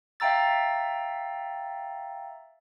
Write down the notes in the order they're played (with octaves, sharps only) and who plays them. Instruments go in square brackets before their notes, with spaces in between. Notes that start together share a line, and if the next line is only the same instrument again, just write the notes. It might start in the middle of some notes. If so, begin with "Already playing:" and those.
[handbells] E5 F5 G5 A#5 E6 A6